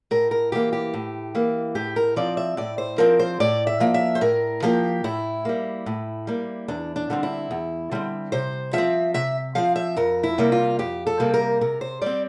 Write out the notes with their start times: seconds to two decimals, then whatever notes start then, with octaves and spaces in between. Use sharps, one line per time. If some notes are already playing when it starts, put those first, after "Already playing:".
0.11 A2 A#4
0.31 A#4
0.52 E3 A#3 G4
0.73 G4
0.94 A2
1.35 E3 A#3
1.75 A2 G4
1.96 A#4
2.16 F3 C4 D5
2.37 E5
2.57 A2 D5
2.78 C5
2.98 F3 C4 A#4
3.19 C5
3.40 A2 D5
3.67 E5
3.80 F3 A#3
3.94 E5
4.15 C5
4.21 A2 A#4
4.62 F3 A#3 G4
5.04 A2 E4
5.45 G3 A#3
5.86 A2
6.27 G3 A#3
6.68 E2 D4
6.96 D4
7.10 D3 G3 C4
7.23 E4
7.51 E2
7.91 D3 G3 C4
8.32 C3 C5
8.73 F3 C4 E5
9.14 C3 E5
9.55 F3 C4 F5
9.76 E5
9.97 F2 A#4
10.23 E4
10.38 C3 G3 A#3
10.52 F4
10.79 F2 G4
11.07 A4
11.20 C3 G3 A#3
11.34 A#4
11.61 C3 A#4
11.81 C5
12.01 G3 C4 D5